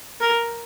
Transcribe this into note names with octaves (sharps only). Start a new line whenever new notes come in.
A#4